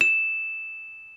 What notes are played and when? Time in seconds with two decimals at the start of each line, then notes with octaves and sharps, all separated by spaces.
0.01 E7